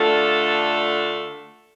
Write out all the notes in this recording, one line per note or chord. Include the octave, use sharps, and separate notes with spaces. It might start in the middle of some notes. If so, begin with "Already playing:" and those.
Already playing: D3 A3 D4 F4 A4